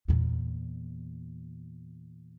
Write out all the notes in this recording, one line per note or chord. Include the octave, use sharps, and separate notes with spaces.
E2 A#2